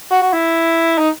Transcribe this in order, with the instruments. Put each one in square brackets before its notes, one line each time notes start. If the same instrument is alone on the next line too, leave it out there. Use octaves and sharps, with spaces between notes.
[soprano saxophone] F#4
F#4
E4
D#4